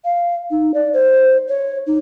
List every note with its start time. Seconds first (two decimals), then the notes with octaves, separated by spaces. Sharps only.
0.05 F5
0.51 D#4
0.74 D5
0.93 C5
1.49 C#5
1.87 D#4